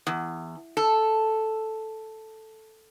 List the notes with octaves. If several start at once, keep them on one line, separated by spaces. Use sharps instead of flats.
E2
A4